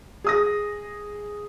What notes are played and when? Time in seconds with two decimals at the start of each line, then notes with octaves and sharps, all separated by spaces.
0.24 G#4 D#6 A#6